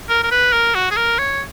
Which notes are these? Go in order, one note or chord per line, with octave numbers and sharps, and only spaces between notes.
A#4
A#4
B4
A#4
F#4
G#4
A#4
C#5